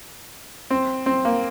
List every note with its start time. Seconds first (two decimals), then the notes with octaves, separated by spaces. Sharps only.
0.70 C4
1.06 C4
1.25 A#3